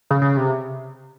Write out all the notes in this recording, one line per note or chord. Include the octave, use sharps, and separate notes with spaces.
C#3
C#3
C3